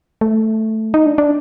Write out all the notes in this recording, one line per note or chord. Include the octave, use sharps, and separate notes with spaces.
A3
D#4
D4
D4